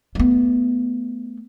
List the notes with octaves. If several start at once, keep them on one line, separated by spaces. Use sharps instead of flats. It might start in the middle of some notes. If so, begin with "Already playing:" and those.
A3 B3